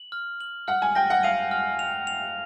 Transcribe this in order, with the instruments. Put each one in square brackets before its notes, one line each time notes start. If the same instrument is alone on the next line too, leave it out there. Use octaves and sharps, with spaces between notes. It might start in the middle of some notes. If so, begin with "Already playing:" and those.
Already playing: [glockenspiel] F#7
F6
F#7
[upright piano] F#5 [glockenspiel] F6
[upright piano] G#5
[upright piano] G5 [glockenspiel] A#6
[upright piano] F#5
[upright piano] F5 [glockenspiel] D#7
[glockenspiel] F6
F7
F7